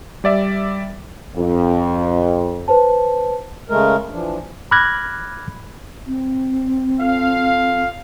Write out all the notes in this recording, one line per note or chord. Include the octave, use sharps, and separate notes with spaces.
G3 D5 E5
F2
B4 C5 A5
C#3 G#3 A3 A#4
E3 F3 D4
B5 D6 F6 F#6 G#6 A#6
C4
F4 A4 F5